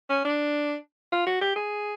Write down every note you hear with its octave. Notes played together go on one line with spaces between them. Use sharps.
C#4
D4
F4
F#4
G4
G#4